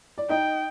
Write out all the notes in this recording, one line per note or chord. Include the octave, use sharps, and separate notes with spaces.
D5
D#4 D#5 G5